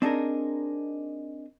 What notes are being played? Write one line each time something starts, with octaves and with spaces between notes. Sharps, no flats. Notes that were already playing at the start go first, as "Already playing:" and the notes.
C4 D4 D#4 G#4 A#4